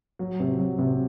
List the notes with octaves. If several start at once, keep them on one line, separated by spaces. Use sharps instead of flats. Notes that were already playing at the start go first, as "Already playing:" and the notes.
F#3
C3
F#3
C3